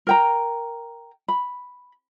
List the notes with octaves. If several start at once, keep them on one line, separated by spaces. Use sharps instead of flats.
A#4 G5 A#5
B5